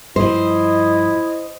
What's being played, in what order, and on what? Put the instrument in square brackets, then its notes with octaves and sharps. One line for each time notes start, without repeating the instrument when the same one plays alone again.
[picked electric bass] G2 F3 [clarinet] E4 [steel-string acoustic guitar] C5 [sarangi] D#5